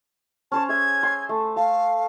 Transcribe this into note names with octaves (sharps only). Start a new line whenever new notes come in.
C#4 C5 C#5 A5
G#4 E5 G#6
C6
A3
F5 A5 C6